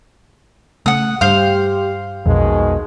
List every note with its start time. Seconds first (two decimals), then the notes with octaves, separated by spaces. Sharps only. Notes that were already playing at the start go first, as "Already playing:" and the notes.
0.86 C#3 A3 F#5 D#6
1.21 G2 G4 C5 F5
2.26 B1 F2 B2 D#3 G#3